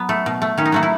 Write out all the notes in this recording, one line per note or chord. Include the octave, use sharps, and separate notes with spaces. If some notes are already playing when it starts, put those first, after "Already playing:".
Already playing: F#3 B3
A3
B2
A3
D#3 C#4
D#4
F#3 A3 F#4
E4